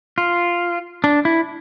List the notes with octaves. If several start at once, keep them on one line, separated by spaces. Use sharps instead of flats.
F4
D4
E4